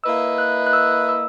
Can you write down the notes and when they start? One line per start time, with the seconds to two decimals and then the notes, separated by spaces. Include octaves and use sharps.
0.04 A#3 E4 B4 D#5 E6
0.38 F#6
0.67 F#6
0.73 E6
1.09 E6